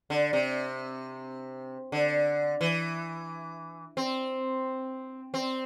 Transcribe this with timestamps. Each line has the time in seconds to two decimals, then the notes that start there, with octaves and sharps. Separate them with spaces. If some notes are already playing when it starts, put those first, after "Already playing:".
0.10 D3
0.33 C3
1.92 D3
2.61 E3
3.97 C4
5.34 C4